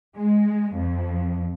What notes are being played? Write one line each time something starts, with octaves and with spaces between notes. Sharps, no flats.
G#3
F2